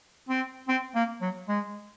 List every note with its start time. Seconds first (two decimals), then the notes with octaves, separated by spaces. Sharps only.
0.29 C4
0.68 C4
0.95 A#3
1.21 F#3
1.48 G#3